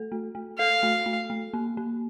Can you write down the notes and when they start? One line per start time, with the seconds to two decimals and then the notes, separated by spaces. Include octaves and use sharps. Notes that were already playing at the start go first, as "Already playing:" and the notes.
Already playing: A3 A4
0.12 A3
0.35 A3
0.59 A4 F5
0.83 A3
1.06 A3
1.30 A3
1.54 A#3
1.77 A#3